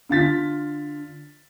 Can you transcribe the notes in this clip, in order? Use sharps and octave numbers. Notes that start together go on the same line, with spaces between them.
D3 F4 A6 B6